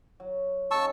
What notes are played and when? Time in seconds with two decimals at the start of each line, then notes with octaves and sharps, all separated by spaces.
0.20 F#3
0.71 C#3 D#4 A5 C#6 E6